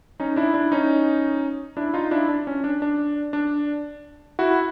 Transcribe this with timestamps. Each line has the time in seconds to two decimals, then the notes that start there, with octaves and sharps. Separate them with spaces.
0.20 C#4 D#4
0.36 D4 E4
0.54 D4 E4
0.72 C#4 D#4
1.77 D4 E4
1.94 D#4 F4
2.11 D4 E4
2.29 D4
2.47 C#4
2.64 D4
2.82 D4
3.33 D4
4.39 E4 F#4